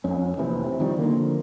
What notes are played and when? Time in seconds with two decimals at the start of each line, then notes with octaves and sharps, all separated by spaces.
0.04 F2 C#4
0.37 F1 A#1 C3 E3
0.64 C3
0.79 G1 D#3 F3 G3
0.99 D3 E3 F3 A#3